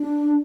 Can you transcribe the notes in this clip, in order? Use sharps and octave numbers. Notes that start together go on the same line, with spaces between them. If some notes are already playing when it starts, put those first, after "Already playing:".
Already playing: D4